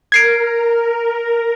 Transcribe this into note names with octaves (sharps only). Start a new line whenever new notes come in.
A#4 G#6 C7 D7